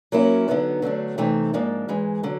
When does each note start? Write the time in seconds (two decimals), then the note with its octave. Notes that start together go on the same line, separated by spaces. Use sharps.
0.12 F#3 A#3 C#4 E4
0.48 D3 F#3 B3 D#4
0.82 D3 F#3 A3 D4
1.18 C3 E3 A3 C4 D#4
1.53 G#2 F3 A#3 D4
1.88 G#2 E3 G#3
2.23 D3 F#3